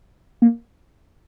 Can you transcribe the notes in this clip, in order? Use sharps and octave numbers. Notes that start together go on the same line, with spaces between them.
A#3